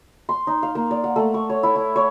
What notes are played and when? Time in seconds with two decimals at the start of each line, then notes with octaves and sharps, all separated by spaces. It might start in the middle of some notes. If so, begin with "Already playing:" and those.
0.29 C6
0.47 D#4
0.63 F5
0.75 A#3
0.91 D5
1.04 F#5
1.16 A3
1.34 C#6
1.50 C#5
1.63 E4
1.76 E4
1.96 C#5